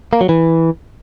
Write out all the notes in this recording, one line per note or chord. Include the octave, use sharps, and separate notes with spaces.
A#3
F#3
E3